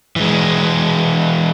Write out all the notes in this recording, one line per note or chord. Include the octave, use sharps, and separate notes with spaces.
E3 G#3